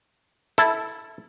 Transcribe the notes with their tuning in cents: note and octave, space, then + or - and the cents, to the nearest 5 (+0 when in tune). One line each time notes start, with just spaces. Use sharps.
E4 -5 A4 +0